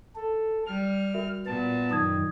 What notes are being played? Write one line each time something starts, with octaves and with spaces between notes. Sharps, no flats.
A4
G3 F6
F#4 A#4 E5
A#2 B3 A5
F#2 D#3 D#6 G#6